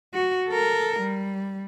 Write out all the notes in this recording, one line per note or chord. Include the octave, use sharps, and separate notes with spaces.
F#4
A4 A#4
G3